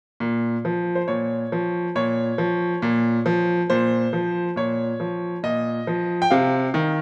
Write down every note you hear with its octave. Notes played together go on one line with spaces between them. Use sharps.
A#2
F3
C5
A#2 C#5
F3
A#2 C#5
F3
A#2
F3
A#2 C5
F3
A#2 C#5
F3
A#2 D#5
F3
G5
C3 F5
D#3